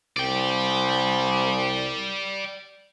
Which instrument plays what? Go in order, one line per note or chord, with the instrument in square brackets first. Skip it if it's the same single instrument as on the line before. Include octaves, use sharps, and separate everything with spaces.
[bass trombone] C2 [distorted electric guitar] D5 G5